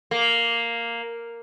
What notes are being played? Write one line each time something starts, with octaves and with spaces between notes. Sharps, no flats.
A#3